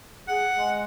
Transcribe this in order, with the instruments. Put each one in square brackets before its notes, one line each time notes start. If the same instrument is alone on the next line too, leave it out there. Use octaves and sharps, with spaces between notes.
[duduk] G#4 [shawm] F#5
[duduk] G#3